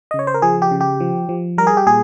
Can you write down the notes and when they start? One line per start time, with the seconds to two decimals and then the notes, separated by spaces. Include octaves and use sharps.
0.11 C#3 D#5
0.19 C#5
0.27 C5
0.34 A#4
0.42 F3 G#4
0.62 G4
0.71 C#3
0.81 G4
1.00 F3
1.29 F3
1.58 G3 A#4
1.67 G#4
1.77 G4
1.86 A#2 G#4